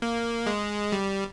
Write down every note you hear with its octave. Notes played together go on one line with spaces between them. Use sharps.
A#3
G#3
G3